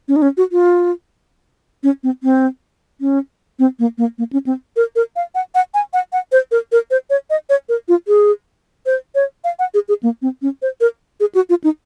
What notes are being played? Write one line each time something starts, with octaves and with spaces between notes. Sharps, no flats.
C#4
D#4
C#4
F#4
F4
C#4
C4
C4
C#4
C4
A#3
A#3
A#3
C#4
C4
A#4
A#4
F5
F#5
F#5
G#5
F#5
F#5
C5
A#4
A#4
C5
C#5
D#5
C#5
A#4
F4
G#4
C5
C#5
F5
F#5
G#4
G#4
A#3
C4
C#4
C5
A#4
G#4
F#4
F4
D#4